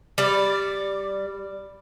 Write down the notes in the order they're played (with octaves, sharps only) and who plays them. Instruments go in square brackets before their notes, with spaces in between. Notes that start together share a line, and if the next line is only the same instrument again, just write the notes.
[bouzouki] G3 D5